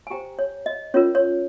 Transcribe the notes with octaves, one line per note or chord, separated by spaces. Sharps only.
G#5
G4 C5 G5 A#5
C#5
D#5
C#4 F4 A#4 C#5
C#5